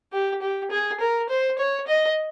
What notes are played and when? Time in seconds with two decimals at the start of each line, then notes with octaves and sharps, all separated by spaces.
0.12 G4
0.42 G4
0.71 G#4
1.00 A#4
1.29 C5
1.58 C#5
1.87 D#5